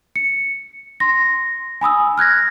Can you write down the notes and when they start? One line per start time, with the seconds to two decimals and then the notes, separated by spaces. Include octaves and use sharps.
0.16 C#7
1.00 C6 A#6
1.81 G#5 B5 D#6 E6
2.18 F6 F#6 G#6 A#6